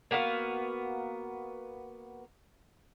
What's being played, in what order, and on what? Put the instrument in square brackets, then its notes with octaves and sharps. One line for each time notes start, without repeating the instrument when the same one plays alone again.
[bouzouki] A#3 B3 F#4 F5